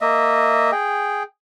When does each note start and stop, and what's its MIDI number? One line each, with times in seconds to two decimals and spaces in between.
0.01 0.71 58
0.01 0.71 75
0.01 0.71 76
0.72 1.23 68
0.72 1.23 79